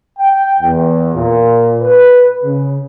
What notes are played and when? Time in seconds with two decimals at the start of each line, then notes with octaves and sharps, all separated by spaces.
0.18 G5
0.60 E2
1.14 A#2
1.81 B4
2.43 C#3